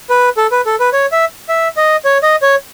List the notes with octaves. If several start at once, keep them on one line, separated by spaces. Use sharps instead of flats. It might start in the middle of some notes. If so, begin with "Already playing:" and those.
B4
A4
B4
A4
B4
C#5
E5
E5
D#5
C#5
D#5
C#5